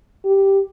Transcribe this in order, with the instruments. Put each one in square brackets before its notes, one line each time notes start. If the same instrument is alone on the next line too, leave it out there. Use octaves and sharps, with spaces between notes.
[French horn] G4